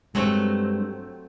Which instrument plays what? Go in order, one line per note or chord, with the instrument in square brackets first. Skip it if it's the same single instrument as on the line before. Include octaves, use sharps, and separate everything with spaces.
[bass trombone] G2 [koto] F#3 A3 C4 [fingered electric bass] G#3